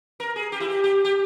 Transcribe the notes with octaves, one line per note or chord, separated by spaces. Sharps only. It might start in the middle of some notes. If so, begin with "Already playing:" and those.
A#4
G#4
G4
E4
G4
G4
G4